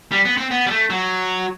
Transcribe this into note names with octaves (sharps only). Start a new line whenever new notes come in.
G3
B3
C4
B3
G3
A3
F#3